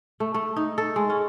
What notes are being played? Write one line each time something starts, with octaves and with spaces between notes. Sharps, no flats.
A3
A3
D#4
A4
G#3
C#4